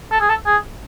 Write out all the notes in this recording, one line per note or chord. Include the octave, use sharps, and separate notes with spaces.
A4
G#4
A4
G#4